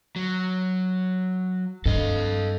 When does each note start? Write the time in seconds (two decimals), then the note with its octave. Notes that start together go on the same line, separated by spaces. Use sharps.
0.16 F#3
1.86 G2 A4 D#5